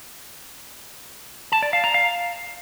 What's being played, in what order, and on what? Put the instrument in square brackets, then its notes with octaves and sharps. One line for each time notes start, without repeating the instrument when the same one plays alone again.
[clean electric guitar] A5
D5
F5
A#5
F5